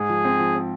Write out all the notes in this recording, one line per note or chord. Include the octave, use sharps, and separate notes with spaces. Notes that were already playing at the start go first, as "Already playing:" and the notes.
Already playing: G#2 G#4
F3
C4
F3
C4